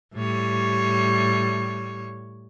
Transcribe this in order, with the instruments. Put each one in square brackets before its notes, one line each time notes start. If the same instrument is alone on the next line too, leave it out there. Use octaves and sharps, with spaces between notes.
[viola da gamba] A2 G3 C#5